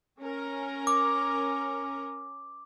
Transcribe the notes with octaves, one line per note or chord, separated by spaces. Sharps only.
C#4 A#4
D6